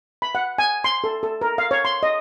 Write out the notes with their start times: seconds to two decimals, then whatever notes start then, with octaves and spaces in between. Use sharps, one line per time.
0.22 B5
0.35 F#5
0.58 G#5
0.84 C6
1.04 A4
1.23 A4
1.41 A#4
1.58 F5
1.71 C#5
1.85 C6
2.03 D#5